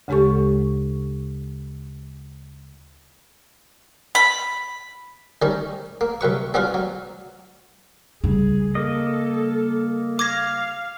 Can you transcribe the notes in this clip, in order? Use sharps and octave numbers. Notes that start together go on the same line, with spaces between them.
D2 C#3 G#3 G4 A4 C#6
B5
D#3 G3 C#4
A#3
C2 F#2 B4 C#6
G3 B3 C#4 F4 F#4 F5
F#3
C#3 G3 G#4
A#3 A4 D#5
F5 D6 G#6 A#6